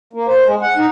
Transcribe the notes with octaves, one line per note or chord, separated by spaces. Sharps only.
A#3
C5
G#3
F#5
D#4